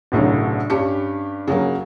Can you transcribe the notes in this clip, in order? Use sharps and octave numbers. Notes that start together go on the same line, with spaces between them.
G1 C2 A2 C#3 F#3
G2 C#4 G4 C#7
C#3 F#3 A#3